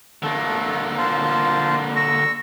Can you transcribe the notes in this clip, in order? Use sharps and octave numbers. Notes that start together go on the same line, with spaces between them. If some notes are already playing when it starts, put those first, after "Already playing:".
D3 A3 A#3 A4
F4 C5 A5
C#6 E6 A#6